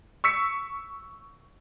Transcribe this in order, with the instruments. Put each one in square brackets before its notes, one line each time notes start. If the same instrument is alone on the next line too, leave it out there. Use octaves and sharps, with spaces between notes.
[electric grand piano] C#6 E6 B6 C#7